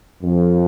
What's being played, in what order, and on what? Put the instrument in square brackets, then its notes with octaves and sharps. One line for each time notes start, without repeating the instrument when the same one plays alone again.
[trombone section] F2